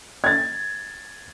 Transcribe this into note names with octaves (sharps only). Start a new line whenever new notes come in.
G#6 A6